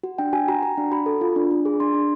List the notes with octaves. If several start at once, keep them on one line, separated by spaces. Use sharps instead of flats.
F#4
D4 G5
F#4 G#5
F#4 A#5
F#4 A#5
D4
F#4 B5
A4
F4
D4
D4
G#4
D4 C6
D4